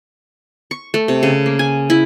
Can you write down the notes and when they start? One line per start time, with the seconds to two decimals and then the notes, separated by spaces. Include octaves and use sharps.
0.71 C#6
0.94 A3
1.08 C3
1.23 C#3
1.46 A#3
1.59 G#5
1.90 E4